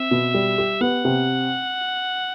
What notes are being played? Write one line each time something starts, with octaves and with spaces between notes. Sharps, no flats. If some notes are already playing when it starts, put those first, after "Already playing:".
Already playing: C4 E5
B2
G3
G4
B3 F#5
C3